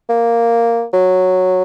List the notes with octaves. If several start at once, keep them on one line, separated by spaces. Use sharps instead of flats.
A#3
F#3